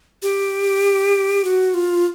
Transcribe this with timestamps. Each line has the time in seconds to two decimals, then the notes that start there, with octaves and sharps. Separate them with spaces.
0.23 G4
1.45 F#4
1.74 F4